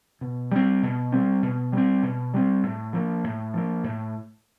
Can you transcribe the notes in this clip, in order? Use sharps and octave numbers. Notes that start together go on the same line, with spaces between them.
B2
G3 C4
B2
G3 C4
B2
G3 C4
B2
G3 C4
A2
F3 A#3
A2
F3 A#3
A2